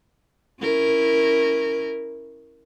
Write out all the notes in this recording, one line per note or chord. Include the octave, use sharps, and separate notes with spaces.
C#4 E4 A#4